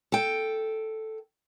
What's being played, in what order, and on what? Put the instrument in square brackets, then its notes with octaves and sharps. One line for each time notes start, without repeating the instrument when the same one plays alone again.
[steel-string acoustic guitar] A4 G5